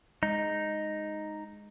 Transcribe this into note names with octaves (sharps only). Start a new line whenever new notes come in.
G#3 D#4